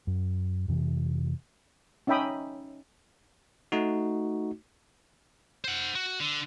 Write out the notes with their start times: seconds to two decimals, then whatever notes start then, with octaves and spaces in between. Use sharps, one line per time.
0.07 F#2
0.68 F2 C3 E3
2.07 C#4 D#4 E5 G5 B5 D#6
3.72 A3 D#4 F#4
5.64 C5 F#5
5.95 F#4
6.20 D3